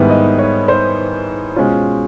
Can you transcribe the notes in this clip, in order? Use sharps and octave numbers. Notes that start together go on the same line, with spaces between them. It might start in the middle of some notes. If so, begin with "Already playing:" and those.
Already playing: G#2 D#3 G3 B3 E4 B4
D#5
C#5
C5
B2 G#3 C#4 F4 C5